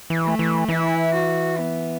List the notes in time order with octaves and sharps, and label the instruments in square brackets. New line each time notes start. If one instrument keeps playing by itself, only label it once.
[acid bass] E3
[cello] A3
[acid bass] E3
[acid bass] E3 [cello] E4
[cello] F#4
B3